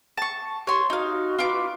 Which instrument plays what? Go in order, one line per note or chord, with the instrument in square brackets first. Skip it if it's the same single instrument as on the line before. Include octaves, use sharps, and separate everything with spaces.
[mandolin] A5 C#6
[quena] G4 [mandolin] C#5 C6
[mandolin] D#4 F5 [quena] F#4
[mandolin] F4 B4 D6